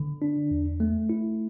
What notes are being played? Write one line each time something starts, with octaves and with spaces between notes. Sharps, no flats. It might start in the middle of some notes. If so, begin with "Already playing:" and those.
Already playing: D3
D4
E2
A3
E4